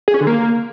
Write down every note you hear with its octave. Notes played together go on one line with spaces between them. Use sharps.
G#4
C#4
D3
A#3